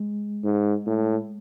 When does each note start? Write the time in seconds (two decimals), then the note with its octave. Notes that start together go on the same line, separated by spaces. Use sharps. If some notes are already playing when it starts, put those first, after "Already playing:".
Already playing: G#3
0.44 G#2
0.87 A2